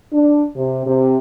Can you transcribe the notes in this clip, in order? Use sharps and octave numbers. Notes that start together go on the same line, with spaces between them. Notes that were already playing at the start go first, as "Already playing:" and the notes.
D4
C3
C3